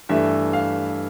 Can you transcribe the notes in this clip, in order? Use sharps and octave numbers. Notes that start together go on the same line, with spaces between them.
G2 E3 A3 E5
F5